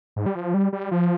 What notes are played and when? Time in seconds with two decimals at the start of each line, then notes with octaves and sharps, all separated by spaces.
0.16 G#2
0.26 G3
0.35 F3
0.54 G3
0.73 G3
0.91 F3